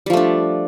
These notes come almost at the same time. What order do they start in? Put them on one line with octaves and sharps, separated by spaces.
G3 F3 A3 D4